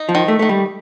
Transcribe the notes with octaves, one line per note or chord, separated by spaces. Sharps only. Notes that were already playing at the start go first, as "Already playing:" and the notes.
Already playing: D#4
F3
D#3
A3
D#3 A3
G3